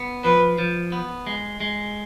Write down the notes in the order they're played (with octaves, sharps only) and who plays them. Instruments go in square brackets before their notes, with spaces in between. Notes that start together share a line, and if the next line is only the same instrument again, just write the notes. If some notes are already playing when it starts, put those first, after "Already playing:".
Already playing: [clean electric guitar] B3
[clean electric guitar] F3 [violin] B4
[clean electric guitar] F3
B3
G#3
G#3